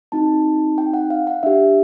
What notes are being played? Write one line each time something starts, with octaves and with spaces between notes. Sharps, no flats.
C4 D#4 F#4 A5
G5
F#5
F5
F#5
D4 G4 E5